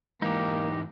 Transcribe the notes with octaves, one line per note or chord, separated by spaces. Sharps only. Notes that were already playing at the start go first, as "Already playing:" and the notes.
G#2 E3 A#3 D#4 G4